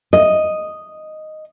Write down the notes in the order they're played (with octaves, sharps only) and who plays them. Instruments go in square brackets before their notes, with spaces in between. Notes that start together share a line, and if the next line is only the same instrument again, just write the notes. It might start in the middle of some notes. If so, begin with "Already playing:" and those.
[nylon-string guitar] D#5